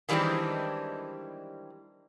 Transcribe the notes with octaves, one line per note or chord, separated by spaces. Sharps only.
D#3 E3 G3 G#3 C4 D4